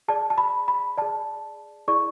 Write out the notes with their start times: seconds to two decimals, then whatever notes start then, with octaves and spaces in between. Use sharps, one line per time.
0.08 G#4 D5 A5
0.30 A5
0.38 B5
0.68 B5
0.98 G#4 D5 A5
1.88 E4 G#4 D5 C#6